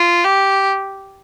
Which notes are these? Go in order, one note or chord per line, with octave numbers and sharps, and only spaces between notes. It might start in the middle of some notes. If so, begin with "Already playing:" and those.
Already playing: F4
G4